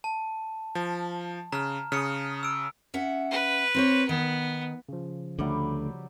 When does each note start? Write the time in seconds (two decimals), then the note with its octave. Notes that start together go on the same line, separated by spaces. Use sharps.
0.04 A5
0.75 F3
1.52 C#3 A#5 F6
1.92 C#3 D#6 F6 C#7
2.43 E6 D7
2.94 C#4 E5 F#5
3.31 B4
3.74 C4 C5 C#5
4.09 D#3 B3
4.89 C#3 F3
5.39 D2 D3 F#3 G3 A3 G4